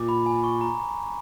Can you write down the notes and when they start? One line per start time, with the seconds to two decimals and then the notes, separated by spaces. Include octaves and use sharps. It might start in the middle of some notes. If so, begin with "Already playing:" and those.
Already playing: A#2 D6
0.09 B5
0.26 G#5
0.44 C#6
0.61 A#5